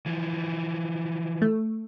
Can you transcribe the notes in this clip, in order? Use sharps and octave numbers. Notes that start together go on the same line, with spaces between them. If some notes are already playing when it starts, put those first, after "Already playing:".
E3 F3
A3